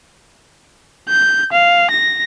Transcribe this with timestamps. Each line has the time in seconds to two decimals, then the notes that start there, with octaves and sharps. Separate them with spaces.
1.09 G6
1.53 F5
1.91 A#6